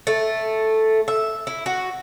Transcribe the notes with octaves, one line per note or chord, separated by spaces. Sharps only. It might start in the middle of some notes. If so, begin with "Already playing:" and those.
A3
E5
E4
F#4